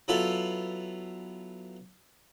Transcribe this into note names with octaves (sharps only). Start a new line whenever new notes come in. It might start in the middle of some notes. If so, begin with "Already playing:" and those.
F#3 B3 E4 F4 A4